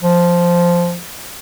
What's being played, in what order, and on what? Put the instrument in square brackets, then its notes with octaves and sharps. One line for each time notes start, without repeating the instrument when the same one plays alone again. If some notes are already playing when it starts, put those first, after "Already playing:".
[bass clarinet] F3